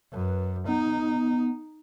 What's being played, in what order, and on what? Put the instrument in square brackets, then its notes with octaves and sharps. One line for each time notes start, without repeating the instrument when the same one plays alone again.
[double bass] F#2 [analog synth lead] B4
[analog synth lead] B3 [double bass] D#4